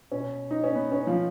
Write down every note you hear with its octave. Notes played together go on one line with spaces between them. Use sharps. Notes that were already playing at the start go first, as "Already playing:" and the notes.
B2 C#4
D#4
C#4
B3
C#4
F3 F4